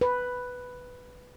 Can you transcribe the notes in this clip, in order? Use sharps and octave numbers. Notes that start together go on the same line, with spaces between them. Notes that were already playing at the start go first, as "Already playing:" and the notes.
B4